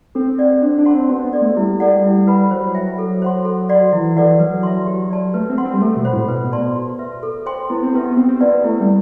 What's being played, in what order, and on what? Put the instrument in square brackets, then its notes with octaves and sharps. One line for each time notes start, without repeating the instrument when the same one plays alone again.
[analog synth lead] C4 [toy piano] A4
[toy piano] D5 F#5
[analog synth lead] D4 [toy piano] C5
[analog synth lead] D4
[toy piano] F#5 A5 C6
[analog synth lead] C4
[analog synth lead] B3 [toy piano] F#4
[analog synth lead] B3
[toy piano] A4 D5
[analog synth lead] A3
[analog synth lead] G3 [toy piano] E4
[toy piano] A4 D5 F#5
[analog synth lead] G3
[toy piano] E4
B4 F#5 B5
[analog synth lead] F#3 [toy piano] C5
[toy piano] E5 G5
A4
C5 F#5 C6
A4
D5 F#5 C6
[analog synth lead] E3 [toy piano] E4
[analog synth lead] E3 [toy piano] A4 D5 F#5
[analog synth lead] F#3 [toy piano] B4
[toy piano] E5 A5 C6
G4
D5 A5
[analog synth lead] A3 [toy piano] B4
[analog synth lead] C4
[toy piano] F#5 A5 C6
[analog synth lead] C4
G3
[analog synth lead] A3 [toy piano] A4
[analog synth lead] B2
[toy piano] C5 F#5 B5
[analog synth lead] A2
[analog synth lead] B2 [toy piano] B4
[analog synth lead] B2
[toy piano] D5 A5 C6
F#4
B4 E5
A4
C5 G5 C6
[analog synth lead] B3 [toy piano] E4
[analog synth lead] C4
[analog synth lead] B3 [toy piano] G4 B4 E5
[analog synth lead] C4 [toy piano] G4
[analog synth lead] C4
[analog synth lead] B3 [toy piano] B4 D5 F#5 A5
[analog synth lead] B3
[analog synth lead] A3 [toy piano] E4
[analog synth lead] G3